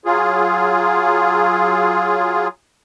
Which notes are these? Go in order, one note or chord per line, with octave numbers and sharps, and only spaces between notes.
F#3 F4 G#4